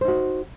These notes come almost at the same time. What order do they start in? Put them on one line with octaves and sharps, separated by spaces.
C5 D#4 F#4